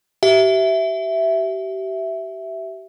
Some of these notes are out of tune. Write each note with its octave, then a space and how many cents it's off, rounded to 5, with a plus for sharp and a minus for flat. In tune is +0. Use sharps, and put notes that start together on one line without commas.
G4 -35 E5 +0